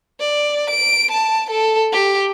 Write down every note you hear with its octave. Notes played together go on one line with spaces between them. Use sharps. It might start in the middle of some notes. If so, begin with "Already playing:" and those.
D5
D7
A5
A4
G4